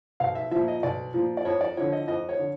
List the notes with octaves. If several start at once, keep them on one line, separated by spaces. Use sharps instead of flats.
B1 F5
E5
A#2 F3 E5
D#5
B1 D5
A#2 F3
D5
F2 C#5
D5
D3 F3 C#5
D#5
F2 D#5
C#5
D3